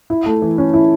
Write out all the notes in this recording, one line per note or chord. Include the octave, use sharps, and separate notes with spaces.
E4
A3
E3
C#4
E4